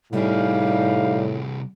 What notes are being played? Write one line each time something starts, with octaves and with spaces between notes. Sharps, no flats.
G1 C2 A2 G3 D#4 G#4 F5